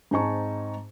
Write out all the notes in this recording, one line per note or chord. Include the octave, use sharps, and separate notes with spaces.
G#2 C4 D#4 G#5 A5 C#6